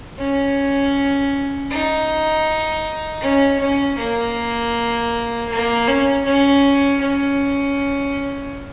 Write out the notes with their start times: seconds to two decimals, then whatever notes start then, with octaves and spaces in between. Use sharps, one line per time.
0.18 C#4
1.71 D#4
3.22 C#4
3.60 C#4
3.98 A#3
5.49 A#3
5.88 C#4
6.25 C#4
7.01 C#4